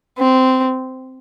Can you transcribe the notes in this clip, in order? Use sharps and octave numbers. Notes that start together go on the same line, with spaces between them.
C4